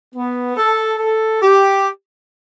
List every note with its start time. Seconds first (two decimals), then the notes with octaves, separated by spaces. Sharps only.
0.15 B3
0.57 A4
0.99 A4
1.42 G4